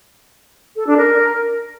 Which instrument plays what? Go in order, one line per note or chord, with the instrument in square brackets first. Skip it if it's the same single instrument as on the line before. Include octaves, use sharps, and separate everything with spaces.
[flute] A4
D4
A#4